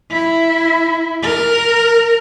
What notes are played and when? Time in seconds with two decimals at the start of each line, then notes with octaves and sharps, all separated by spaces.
0.11 E4
1.22 A#4